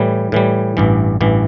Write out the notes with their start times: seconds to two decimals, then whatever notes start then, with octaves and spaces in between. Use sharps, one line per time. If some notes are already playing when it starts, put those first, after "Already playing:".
Already playing: A2 E3 G3
0.32 A2 E3 G3
0.77 A1 G2 E3
1.21 A1 G2 E3